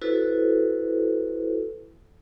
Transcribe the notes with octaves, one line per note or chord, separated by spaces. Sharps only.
E4 F#4 A4 B4 C5